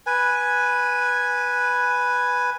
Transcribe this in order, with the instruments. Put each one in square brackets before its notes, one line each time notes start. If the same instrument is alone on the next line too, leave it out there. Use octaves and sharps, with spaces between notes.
[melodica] B4 G#5